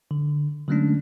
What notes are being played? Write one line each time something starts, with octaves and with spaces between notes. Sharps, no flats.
D3
D3 F#3 G#3 A3 C#4 D4